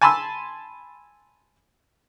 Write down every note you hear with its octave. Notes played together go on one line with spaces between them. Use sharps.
G#5 A5 B5 C6 E6